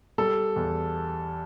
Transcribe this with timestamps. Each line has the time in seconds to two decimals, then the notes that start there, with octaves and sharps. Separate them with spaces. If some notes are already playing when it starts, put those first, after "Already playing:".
0.18 G3 A4
0.56 E2